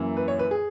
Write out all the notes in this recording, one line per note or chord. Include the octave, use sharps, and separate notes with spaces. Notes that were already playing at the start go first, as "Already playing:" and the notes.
Already playing: F#2 E3 A#3
B4
C#5
B4
G#4